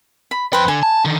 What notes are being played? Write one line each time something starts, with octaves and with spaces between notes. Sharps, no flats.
B5
F2 B4 C5 G5
D3 G#5
A5
D3 D#3